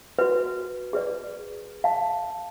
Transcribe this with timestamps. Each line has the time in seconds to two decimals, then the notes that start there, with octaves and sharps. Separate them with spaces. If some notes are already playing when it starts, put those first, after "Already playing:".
0.19 F#4 B4
0.93 G#4 B4 D5
1.84 F5 A5